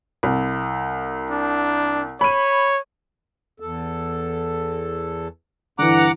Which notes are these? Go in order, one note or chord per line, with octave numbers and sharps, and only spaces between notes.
C2
D4
C#5 B5 D#7
E2 A4
G2 D3 E3 F#5 A#5 D6